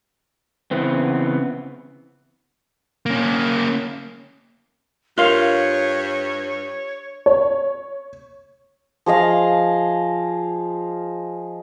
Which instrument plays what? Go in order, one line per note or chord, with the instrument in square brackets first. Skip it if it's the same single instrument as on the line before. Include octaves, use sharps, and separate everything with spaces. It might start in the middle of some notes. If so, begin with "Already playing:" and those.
[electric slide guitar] C#3 E3 B3 C4
[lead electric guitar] A#3 C#4
[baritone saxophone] G2 [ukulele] F4 F5 [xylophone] A#4 C6 F7 [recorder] C#5
[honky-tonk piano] C#5
[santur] F3 G#4 D#5 F5